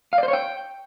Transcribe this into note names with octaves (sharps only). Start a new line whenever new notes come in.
F5
D5
C5
C#5
G5